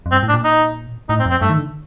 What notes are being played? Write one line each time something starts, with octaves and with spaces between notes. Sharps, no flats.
F2
G2 C4
A2
D4
A#2
D#4
A2 D#4
C4
F2
C4
G2 A3
D#3
D3